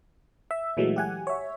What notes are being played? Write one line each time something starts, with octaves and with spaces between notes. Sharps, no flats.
E5
A#2 E3 F#3 G#3 A3
G4 F#5 G#5
C#5 E5